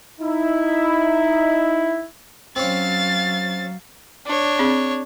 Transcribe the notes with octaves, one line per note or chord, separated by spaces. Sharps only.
D#4 E4
F#3 C4 C#4 F5 A6
D4 C#5
C4 G#4